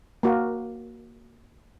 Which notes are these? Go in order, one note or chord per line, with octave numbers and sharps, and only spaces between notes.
A#3 F#4